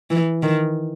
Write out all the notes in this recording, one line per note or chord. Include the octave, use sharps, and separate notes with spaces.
E3
D#3